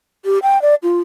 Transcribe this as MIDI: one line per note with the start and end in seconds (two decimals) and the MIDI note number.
0.25 0.38 67
0.43 0.60 79
0.62 0.75 74
0.83 1.01 65